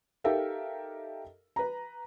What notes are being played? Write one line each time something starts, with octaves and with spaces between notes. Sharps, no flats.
D#4 G4 A4 A#4 E5 F5
B4 A#5